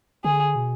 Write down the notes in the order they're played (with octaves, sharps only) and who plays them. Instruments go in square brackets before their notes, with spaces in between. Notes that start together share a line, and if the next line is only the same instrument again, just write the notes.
[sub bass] D3 [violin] G#4
[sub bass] B2